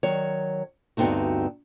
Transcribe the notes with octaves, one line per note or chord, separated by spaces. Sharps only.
D#3 F#3 C#5
D2 G2 B3 C4 D#4 F#4